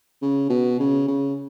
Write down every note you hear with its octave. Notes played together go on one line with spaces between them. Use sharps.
C#3
B2
C#3
C#3